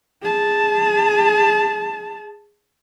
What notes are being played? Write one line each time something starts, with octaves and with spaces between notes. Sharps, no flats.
G#4 A5